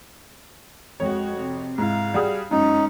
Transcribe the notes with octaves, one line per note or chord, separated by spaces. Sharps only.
F2 G#3 F#4 C#5
C3
G#2 E4 F5
G3 F#4 G#4
F#2 G#3 C#4 D#4